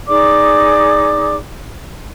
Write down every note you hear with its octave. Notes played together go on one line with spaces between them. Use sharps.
D#4 G#4 D5 D6